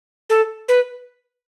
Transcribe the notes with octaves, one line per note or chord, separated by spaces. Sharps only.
A4
B4